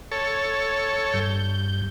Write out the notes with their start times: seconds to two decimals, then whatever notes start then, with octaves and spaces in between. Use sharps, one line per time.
0.11 A4 C#5
1.14 G2 G6